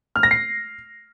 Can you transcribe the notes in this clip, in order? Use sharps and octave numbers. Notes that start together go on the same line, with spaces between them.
F6
A#6
C7